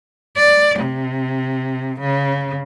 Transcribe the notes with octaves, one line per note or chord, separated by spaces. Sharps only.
D5
C3
C#3